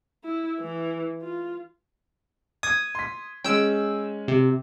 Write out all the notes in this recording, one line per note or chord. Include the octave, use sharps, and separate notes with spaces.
E4
E3
F4
D#6 G#6
C6 B6
G#3 C#4 G5 E6
C3